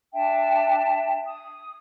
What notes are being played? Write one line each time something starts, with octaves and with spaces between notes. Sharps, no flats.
D4 E5 G5 A5
D#6